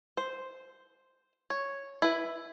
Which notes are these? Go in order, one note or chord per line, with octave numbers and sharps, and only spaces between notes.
C5
C#5
E4 B4